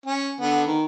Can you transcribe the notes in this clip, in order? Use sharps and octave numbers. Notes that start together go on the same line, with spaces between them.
C#4
D3 B3
D#3